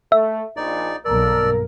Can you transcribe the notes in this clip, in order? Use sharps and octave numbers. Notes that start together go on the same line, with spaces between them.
A3 E5
A#1 D#4 D5
B1 G2 A#3 A4 A#4 D5